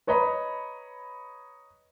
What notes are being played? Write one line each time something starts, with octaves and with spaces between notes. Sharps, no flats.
B4 C#5 D#5 A#5 B5